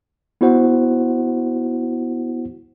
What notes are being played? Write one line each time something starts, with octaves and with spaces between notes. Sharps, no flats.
B3 E4 F#4 C5 F#5